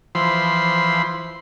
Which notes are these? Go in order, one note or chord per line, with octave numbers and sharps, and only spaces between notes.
E3 F3 C5 B5 C6